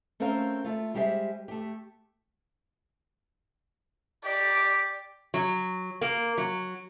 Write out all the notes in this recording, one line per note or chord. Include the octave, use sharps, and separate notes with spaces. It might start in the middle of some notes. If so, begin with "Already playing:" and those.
A3 C4 C#4 A#4 C5 F5
A3 F4
G3 G#3 G4 G#4 C5 E5
A3 G4
G4 D5
F#3
A#3
F#3